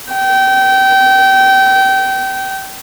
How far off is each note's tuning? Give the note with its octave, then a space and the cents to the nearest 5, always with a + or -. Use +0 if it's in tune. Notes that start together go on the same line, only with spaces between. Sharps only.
G5 -25